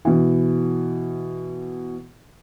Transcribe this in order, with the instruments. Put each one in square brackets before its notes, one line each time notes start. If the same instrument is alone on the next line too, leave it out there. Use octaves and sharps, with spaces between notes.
[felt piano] B2 E3